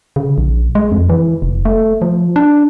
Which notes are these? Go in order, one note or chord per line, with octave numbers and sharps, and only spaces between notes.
C#3
A#1
G#3
F2
E3
F1
A3
F3
D4